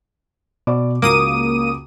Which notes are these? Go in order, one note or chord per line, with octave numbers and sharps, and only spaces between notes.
B2 D5 D6
C#2 C#3 A#3 F#4 D6 D#6 D#7